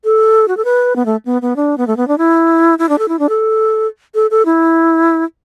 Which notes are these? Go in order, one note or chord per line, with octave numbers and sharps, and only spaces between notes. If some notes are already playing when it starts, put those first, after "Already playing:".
A4
F#4
A4
B4
B3
A3
B3
B3
D4
B3
A3
B3
D4
E4
E4
D4
A4
E4
D4
A4
A4
A4
E4